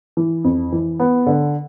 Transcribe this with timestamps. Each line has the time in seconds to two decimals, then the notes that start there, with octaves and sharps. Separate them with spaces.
0.17 E3
0.44 F2
0.72 E3
0.99 B3
1.27 D3